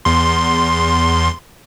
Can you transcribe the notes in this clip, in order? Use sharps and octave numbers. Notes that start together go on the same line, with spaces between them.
E2 C6